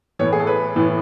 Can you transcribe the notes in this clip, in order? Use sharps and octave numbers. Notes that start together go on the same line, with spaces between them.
A2 E3 B3 C#5
G#4
A4
B4
A2 E3 B3